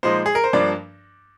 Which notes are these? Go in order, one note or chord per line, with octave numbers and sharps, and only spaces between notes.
A#2 F3 G#3 D#4 C5
G#4
A#4
C5
G2 F3 A#3 D4 D5